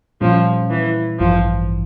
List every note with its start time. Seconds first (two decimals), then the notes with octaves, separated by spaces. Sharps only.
0.21 A#2 F3 G3 C#4
0.70 E3
1.19 A1 G2 E3 F3